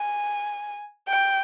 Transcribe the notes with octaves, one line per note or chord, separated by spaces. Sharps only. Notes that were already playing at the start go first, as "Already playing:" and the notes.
Already playing: G#5
G5